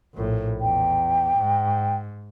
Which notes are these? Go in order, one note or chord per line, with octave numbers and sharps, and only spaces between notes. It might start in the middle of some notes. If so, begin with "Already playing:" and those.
A#1 A2
E2 G5
G#2